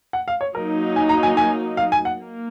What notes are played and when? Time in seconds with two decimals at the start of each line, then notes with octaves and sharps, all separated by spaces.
0.13 F#5
0.28 F5
0.41 C#5
0.55 F#3 A#3 D#4 A#4
0.96 G#5
1.09 A#5
1.23 G#5
1.37 G#5
1.77 F5
1.92 G#5
2.05 F#5
2.18 A#3